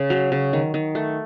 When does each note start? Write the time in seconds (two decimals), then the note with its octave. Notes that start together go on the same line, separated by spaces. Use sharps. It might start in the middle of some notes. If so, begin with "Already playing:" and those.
Already playing: C#3
0.10 F#3
0.32 C#3
0.53 D#3
0.74 D#3
0.95 A3